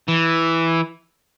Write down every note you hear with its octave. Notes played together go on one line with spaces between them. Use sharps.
E3